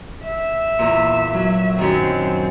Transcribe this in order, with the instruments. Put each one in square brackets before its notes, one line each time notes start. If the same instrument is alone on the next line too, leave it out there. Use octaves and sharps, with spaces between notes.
[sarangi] E5
[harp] E2 A#2
F#3
[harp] F#2 D#3 [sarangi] C4